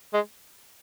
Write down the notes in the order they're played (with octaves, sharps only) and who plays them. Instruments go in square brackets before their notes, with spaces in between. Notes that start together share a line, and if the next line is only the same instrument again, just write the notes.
[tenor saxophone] G#3